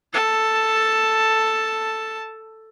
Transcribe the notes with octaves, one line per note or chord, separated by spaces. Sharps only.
A4 A5